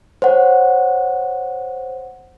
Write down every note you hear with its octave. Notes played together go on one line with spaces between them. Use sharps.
C5 C#5 F#5